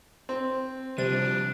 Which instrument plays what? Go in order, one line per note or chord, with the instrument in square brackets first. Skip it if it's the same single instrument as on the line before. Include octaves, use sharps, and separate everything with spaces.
[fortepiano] C4
[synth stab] C3 D#7 [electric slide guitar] F3 G3 [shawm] D4